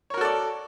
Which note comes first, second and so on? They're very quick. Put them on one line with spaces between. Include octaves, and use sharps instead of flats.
C#5 A#4 F#4 A4 D5